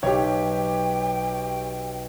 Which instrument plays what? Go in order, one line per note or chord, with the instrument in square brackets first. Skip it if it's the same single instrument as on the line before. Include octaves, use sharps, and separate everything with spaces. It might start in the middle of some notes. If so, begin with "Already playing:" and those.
[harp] B1 [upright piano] G4 C#5 [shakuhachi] G5